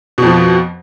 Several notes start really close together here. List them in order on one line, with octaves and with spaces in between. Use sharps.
B2 F2 F3